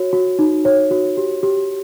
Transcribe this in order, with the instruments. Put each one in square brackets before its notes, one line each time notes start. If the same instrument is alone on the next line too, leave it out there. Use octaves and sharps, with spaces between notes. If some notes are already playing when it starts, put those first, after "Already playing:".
Already playing: [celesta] F#4 C#5
F#4
D#4
C#5
F#4
G4
G4